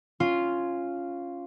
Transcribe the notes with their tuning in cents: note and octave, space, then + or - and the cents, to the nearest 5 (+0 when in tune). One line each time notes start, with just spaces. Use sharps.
C#4 +0 F4 -5